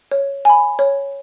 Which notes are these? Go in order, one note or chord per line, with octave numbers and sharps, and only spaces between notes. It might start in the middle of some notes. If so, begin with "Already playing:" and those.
C#5
G#5 B5
C#5